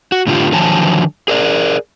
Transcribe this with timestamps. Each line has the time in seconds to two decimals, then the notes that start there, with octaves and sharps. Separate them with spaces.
0.12 F#4
0.27 A2 D3 F4 G4
0.52 D3 D#3 F3 F#3 G#5 A5
1.28 G#4 A#4 D5